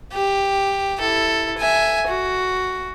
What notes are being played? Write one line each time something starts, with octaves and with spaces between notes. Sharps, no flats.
G4
E4 A4
E5 G#5
F#4